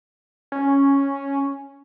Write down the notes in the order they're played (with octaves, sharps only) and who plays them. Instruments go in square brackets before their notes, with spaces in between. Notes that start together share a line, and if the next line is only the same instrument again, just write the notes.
[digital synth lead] C#4